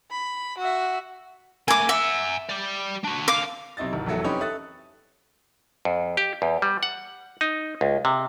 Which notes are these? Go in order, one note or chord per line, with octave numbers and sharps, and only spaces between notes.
B5
F#4 E5
A3 A#3 G#5 D6
E5 F#5 G#5
G4 D5
D4 F#4
D3 F5 D6
B1 C3 E4 D#5 A6
D1 G#1
F1 E2 F#3 A4 E5
C4 C#4 D#4 G4 B4 C#5
A4 E5 D#6 F#6 A6
F2
G4
E2
G3
F#5
D#4
C#2
C3